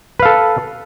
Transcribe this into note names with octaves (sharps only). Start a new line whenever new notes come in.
A4 B4 F5